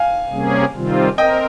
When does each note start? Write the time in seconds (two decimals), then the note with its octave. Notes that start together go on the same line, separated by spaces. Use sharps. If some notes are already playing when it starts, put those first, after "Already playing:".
Already playing: F5 G#5
0.29 C3 G3 A#3 C#4 G#4
0.74 C3 D#3 G3 C4 F4
1.17 C4 A#4 D#5 G5